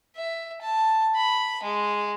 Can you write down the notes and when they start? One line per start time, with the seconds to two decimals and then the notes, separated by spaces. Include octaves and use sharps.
0.17 E5
0.62 A5
1.16 B5
1.63 G#3